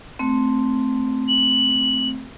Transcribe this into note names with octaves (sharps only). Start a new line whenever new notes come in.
A3 C4
F#7